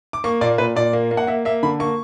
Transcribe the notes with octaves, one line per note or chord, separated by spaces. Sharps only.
D6
A#3 C#6
A#2 D5
A#2 B4
A#2 D5
A#3
A#3
F#5
A#3 E5
A#3 E5
D3 B5
A#3 C#6